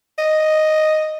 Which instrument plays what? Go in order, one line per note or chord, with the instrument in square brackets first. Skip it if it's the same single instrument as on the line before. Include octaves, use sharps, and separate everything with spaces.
[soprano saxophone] D#5